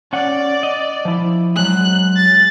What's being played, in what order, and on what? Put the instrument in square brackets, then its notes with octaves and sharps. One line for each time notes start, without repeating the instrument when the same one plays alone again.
[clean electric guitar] C#4 F#5 [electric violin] D5
[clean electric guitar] D#5
F3 E4
[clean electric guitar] F#3 G#3 [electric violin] F#6
[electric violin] A6